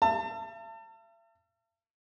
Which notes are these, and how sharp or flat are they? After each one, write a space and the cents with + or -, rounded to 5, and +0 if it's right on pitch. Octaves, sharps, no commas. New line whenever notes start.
E5 +45 A5 +35